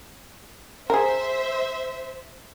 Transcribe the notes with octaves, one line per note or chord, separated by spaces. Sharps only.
G#4 A#4 C5 E5